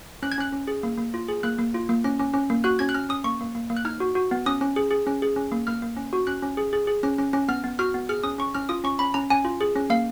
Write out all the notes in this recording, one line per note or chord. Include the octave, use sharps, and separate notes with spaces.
C#4 F#6
G#6
C#4 F#6
C#4
G#4
A#3
A#3
F4
G#4
A#3 F#6
A#3
F4
A#3
C#4
C#4
C#4
A#3
F#4 F#6
C#4 G#6
F#6
C#4 F6
C#4 D#6
A#3 C#6
A#3
A#3
A#3
F#6
D#4 F6
F#4
F#4
B3
C#4 D#6
C#4
G#4
G#4
C#4
G#4
C#4
A#3
A#3 F6
A#3
C#4
F#4
C#4 F#6
C#4
G#4
G#4
G#4
C#4
C#4
C#4
B3 F6
B3
F#4 F6
B3
G#4 F6
C#4 D#6
C#4 C#6
C#4 F6
F4 D#6
C#4 C#6
C#4 B5
C#4 A#5
C#4 G#5
F4
G#4
C#4
A#3 F5